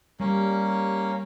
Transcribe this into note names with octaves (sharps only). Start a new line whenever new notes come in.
G3 A#3 C#4